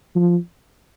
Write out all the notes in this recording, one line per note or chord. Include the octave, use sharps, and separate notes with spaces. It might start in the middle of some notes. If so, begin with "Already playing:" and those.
F3